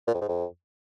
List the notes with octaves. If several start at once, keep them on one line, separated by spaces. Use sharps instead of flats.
A#2
F2
G#2
F2